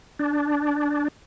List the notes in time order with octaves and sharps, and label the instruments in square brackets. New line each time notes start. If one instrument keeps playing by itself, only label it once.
[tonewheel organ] D4